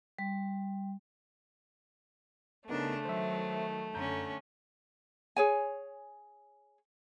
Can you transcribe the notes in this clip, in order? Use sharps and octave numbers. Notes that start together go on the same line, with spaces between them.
G3
C#3 A3 B3 D4 D#4 A#4
D#3 F#3 C5 E5
F#2 D3 C#4 A#5 G6
G#4 C#5 G#5